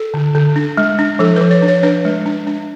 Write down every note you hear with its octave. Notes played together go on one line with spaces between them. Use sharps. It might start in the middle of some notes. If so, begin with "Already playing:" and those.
Already playing: A4
D3
D3
D4
G#3
D4
F3 A4
F3 B4
C#5
D4
C#5
D4 B4
G#3
D4
D4